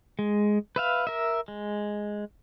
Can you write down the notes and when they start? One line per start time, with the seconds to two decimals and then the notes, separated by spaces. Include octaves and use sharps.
0.19 G#3
0.76 B4 E5 F5
1.07 A#4 E5
1.48 G#3